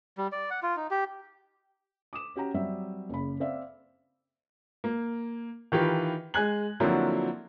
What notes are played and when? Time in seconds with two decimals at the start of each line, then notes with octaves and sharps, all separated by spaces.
0.18 G3
0.32 D5
0.51 F#5
0.63 F4
0.76 D#4
0.91 G4
2.13 D6 D#6 E7
2.36 C#4 F#4 G4 G5 A#5
2.54 F#3 G3 C4 E5
3.09 F#1 C#3 B5
3.40 C4 D5 E5 F5
4.84 A#3
5.72 D#3 E3 F4 G4
6.34 G#3 G#5 F#6 G#6 F#7
6.80 D3 F3 F#3 A#3 C4 E4